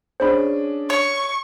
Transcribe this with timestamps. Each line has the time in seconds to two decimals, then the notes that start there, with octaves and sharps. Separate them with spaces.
0.20 C#4 D4 G#4 C5 B5
0.90 C#5 C#6